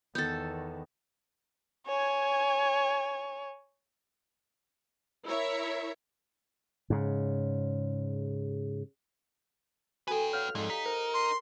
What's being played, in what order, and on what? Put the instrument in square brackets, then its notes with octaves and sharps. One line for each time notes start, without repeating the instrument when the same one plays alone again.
[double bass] E2 D#3 [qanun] B3 A4 [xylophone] G6 A6
[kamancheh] C#5 G#5
[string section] E4 A#4 C#5 E5
[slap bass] G#2 C#3
[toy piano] F#4 A4 [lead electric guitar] B4 G5 [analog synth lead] G#5
[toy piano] C#5 F5 F#5 [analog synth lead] F6
[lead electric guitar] F2 [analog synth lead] G#2 [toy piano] A4 D5
[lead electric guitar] D#4 [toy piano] G4 F5 G#5 [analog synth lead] B6
[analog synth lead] A#4 [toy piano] C5
[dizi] C6